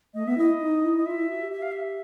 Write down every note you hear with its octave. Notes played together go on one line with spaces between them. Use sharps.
A3 D#5
B3 E5
E4 D#5
D#4
E4
D#5
F4 E5
E4
F#4
G4
E5
F5
E5